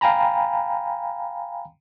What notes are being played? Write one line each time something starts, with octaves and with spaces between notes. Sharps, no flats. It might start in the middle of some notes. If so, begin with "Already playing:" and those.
F5 G5 G#5 A#5 B5